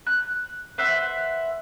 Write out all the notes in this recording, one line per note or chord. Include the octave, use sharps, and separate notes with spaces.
F#6
B4 C5 E5 F#5